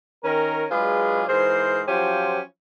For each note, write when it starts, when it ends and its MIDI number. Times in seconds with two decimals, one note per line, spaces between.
0.24 0.64 51
0.24 0.64 61
0.24 0.64 70
0.71 1.23 54
0.71 1.23 56
0.71 1.23 62
0.71 1.23 65
0.71 1.23 68
0.71 1.23 71
1.29 1.81 44
1.29 1.81 52
1.29 1.81 68
1.29 1.81 70
1.29 1.81 72
1.88 2.41 53
1.88 2.41 54
1.88 2.41 61
1.88 2.41 65
1.88 2.41 67
1.88 2.41 72